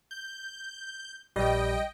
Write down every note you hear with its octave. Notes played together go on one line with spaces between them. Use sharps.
G6
A#1 G3 D#5 G5